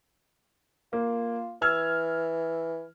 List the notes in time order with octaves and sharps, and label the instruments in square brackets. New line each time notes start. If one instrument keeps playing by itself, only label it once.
[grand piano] A#3 [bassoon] F4
[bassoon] E3 [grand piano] E6 F6 G#6